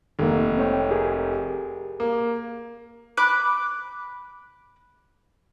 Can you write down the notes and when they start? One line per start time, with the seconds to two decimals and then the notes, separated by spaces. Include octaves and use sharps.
0.19 F1 D#3 G#3 A#3
0.57 C4 C#5 G5
0.91 G4 G#4 A#4
2.00 A#3
3.17 B5 D6 F#6